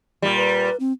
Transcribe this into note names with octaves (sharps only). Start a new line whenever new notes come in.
A#2 G3
B4
C4